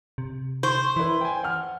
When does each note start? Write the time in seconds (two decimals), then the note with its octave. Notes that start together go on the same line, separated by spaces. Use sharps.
0.18 C3
0.63 C5
0.96 E3 E4 B4
1.21 G5 G#5
1.43 F#5 F6